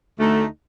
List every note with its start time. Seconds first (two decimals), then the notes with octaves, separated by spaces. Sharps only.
0.17 D2 D3 A3 D#4